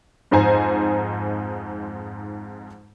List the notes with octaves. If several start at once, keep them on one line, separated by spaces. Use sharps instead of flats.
F2 G#2 D#4 C5 G#5 A#5